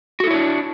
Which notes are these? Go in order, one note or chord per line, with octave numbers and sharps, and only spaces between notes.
D4 E4 F#4 A4 C#5